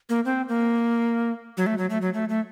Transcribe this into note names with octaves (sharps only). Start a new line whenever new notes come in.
A#3
C4
A#3
F#3
A3
F#3
A3
F#3
A3
A3